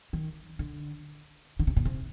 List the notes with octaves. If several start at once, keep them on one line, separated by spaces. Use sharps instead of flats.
D#3
D3
D3
C3
A#2
C3